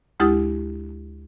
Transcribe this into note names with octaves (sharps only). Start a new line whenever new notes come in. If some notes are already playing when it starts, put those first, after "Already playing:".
D2 G#3 E4 G4 D#6 A6